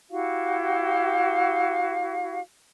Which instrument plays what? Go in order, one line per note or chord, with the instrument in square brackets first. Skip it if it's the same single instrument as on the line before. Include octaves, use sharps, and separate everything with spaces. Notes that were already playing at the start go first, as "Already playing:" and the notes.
[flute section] E4 F#4 G4 F5